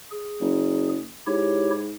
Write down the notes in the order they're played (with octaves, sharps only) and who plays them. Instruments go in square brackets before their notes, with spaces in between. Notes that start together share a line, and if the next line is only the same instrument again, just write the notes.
[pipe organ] G#4
[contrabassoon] F#1
[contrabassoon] G#2 [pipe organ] E4 G4 C#5